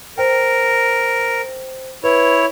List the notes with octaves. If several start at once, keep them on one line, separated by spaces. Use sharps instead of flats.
A#4 C5 G5
E4 B4 C#5